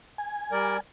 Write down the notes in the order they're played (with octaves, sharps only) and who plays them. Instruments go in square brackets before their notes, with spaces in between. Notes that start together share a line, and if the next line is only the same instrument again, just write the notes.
[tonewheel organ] G#5
[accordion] G3 A#4 D5